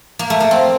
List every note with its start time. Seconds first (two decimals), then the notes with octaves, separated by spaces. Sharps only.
0.19 A#3
0.30 A3
0.40 A#3
0.51 C4